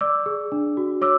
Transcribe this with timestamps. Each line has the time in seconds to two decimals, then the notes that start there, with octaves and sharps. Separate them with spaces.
0.01 D5 D6 E6
0.26 G#4
0.52 D4
0.77 F#4
1.01 C#5 D6 E6